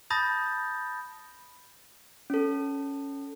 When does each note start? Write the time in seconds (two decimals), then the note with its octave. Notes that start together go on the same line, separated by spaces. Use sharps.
0.10 A5 B5 D#6 G6 A6 A#6
2.30 C#4 A4